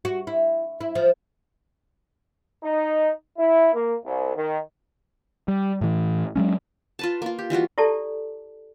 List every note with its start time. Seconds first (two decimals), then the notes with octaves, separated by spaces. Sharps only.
0.05 F#4
0.27 E4
0.81 E4
0.95 F3
2.62 D#4
3.37 E4
3.73 A#3
4.04 C2
4.35 D#3
5.48 G3
5.81 A2 E3
6.36 F#3 G#3 C#4
6.99 F4 B4 A5
7.22 A#3 F4
7.39 G4
7.50 E3 G3 F4 F#4
7.78 E4 G4 A4 D5 A5